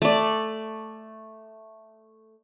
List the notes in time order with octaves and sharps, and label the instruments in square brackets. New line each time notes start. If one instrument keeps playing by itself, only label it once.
[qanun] A3 D5